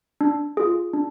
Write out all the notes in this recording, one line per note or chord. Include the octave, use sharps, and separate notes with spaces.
D4
F4 G#4
D4